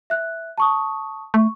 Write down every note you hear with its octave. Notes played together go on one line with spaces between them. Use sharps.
E5 F#6
A5 C#6 D#6
A3 C#6